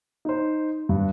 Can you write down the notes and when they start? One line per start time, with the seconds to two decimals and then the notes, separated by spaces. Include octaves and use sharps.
0.25 D#4 C5
0.89 G2